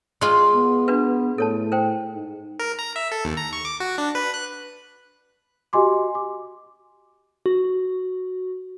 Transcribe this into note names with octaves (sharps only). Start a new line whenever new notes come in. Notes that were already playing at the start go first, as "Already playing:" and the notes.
G#3 F4 C6 C#6
B3
D4 F#4 B4
A2 A4 C#5 A5
A#4 C5 G5
G#2
A#4
A#5
E5
A4
D#2
A#5
C#6
D6
F#4
D4
B4
F#6
F#4 G4 D#5 G#5 C6 D6
D6
F#4